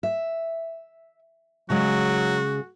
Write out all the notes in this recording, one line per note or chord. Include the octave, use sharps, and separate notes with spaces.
E5
C#3 F#3 G#3 F#4